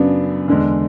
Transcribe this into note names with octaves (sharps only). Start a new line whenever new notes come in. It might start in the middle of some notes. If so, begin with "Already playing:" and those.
Already playing: F#2 C#3 F#3 B3 D4
E2 D3 G#3